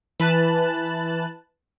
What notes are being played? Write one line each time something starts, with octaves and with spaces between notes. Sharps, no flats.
E3 B4 A5 F#6